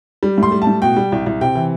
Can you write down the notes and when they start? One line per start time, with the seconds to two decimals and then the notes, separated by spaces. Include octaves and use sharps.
0.23 G3
0.38 A2 C6
0.52 G3
0.62 A5
0.67 A2
0.82 B2 G5
0.97 G3
1.12 C2
1.26 C2
1.41 C3 G5
1.55 E3